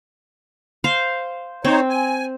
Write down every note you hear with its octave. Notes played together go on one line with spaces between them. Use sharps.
C5 F5
C4 D#4 C5 C#5
G#5